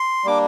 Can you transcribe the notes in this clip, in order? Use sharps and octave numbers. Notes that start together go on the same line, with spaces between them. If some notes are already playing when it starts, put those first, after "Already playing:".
Already playing: C6
G3 A#3 D4 D6